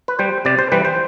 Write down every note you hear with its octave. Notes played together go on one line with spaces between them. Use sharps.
B4
G3 C5
C3 D5
C5
E3 G3 B4
C5